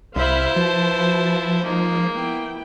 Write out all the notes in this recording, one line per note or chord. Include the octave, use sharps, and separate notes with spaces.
C2 E4 C5 E5 F5 B5
F3 F#4 B4 A5
G#3 A#3 D#4 F4
B3 E4 G5